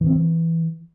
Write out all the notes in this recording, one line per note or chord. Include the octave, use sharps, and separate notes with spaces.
E3
C4
E3